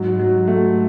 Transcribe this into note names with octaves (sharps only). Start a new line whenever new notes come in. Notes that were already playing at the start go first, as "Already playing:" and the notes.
Already playing: G#2 F#3
F#3
A3